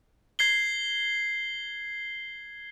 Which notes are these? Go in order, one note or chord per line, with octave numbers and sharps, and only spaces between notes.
G#6 C7 G7